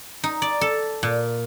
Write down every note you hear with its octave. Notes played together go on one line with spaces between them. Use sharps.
D#4
D5
A4
A#2